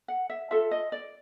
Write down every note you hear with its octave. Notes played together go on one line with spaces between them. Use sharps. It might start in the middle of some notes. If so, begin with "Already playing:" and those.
F#5
E5
F4 A4 E5
D#5
D5